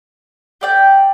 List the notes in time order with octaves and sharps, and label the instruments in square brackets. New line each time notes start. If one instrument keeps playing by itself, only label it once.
[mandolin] G4 D5 G5